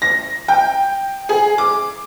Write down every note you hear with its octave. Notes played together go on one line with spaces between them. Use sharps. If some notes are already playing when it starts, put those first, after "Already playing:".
A#6
G5
G#4
D6